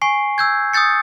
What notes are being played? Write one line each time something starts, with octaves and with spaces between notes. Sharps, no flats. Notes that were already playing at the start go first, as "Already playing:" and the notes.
G#5 C#6 C7
E6 G6 G#6
D#6 E6 G6 A6 C#7